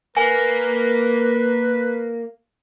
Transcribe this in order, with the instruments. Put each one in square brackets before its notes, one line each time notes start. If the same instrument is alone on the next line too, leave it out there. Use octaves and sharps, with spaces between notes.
[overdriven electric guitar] A#3 [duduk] B4 [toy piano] G#5